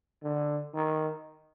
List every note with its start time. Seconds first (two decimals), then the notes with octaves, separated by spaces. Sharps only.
0.23 D3
0.74 D#3